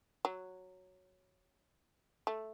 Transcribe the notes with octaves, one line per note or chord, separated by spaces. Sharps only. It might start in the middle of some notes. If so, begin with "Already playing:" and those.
F#3
A3